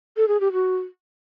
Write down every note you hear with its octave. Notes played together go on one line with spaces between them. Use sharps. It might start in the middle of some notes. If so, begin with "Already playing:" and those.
A4
G#4
G4
F#4